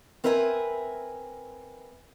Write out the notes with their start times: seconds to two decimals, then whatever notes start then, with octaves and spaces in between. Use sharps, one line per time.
0.24 C4 A#4 B4 E5 F5 G#5